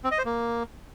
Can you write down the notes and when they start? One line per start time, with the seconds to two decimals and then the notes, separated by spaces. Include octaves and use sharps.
0.04 C4
0.11 D#5
0.18 C5
0.25 A#3